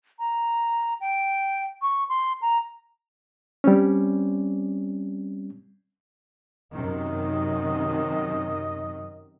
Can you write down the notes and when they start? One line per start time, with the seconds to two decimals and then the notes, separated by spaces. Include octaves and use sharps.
0.19 A#5
1.01 G5
1.82 C#6
2.09 C6
2.42 A#5
3.64 G3 C4 C#4
6.73 F#2 C3 D#3 D#5